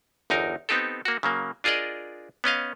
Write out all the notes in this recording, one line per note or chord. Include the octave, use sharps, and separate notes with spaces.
G1 E2 D#4 A#4
B3 C4 D#4 G4 A4
A#3 F#4
C#3 F#3 A#3
D4 F4 G#4 A#4 D5 D#5
B3 C#4 D#5 F5